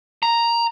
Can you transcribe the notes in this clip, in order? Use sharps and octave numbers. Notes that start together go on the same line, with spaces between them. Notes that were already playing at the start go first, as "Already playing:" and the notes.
A#5